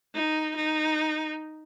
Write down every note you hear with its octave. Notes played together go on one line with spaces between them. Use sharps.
D#4
D#4